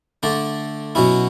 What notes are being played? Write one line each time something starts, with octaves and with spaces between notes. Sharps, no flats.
D3 A3 D4
B2 F#3 C#4 E4